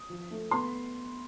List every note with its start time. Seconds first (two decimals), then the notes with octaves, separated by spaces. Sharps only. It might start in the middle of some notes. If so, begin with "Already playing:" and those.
Already playing: D#6
0.10 F3
0.31 A3
0.51 B3 C6